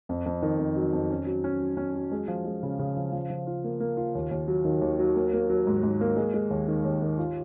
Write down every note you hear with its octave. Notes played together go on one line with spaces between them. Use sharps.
F2
F2
D#3
F2
F#3
F2
C#4
F#3
C#4
F#3
C#4
F#3
G#3
F3
G#3
C#3
C#3
F3
F3
F3
F4
A#3
A#3
F4
D#2
D#2
F#3
D#3
D#2
F#3
A#3
A#3
F#3
G#2
G#2
A#3
G#3
G#3
D#2
D#3
D#2
D#3
F4